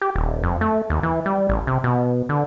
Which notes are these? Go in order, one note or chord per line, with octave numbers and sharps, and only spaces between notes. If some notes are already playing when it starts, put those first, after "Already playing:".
G4
D#1
F2
A3
D#2
E3
G3
A1
C3
B2
D3